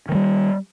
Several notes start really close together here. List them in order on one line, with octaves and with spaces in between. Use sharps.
D#3 G#3 G3